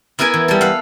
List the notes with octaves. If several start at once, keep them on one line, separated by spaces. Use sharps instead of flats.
B3 E4 A#4 B4 G#5
E3
G3 A4
B4 F5 F#5